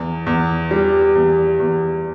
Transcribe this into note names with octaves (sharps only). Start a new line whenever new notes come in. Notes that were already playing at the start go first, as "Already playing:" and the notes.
Already playing: E2
E2
G3
E2
E2